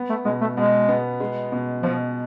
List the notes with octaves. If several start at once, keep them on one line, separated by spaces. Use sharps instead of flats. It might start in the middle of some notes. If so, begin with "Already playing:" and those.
Already playing: B3
A3
B2 G#3
A3
B2 G#3
B3
G#3
B2
B2 F3